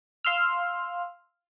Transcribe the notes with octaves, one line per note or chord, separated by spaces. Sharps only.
F5 C6 E6 F6